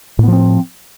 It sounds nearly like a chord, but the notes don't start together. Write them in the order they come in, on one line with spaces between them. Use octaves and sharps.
A2 B3 F3 C4